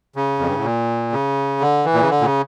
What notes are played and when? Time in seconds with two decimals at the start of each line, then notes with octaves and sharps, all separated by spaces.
0.16 C#3
0.39 F2
0.47 G2
0.56 A2
0.64 A#2
1.12 C#3
1.60 D3
1.85 E3
1.94 A#2
2.02 C#3
2.10 D3
2.21 A#2
2.25 C#3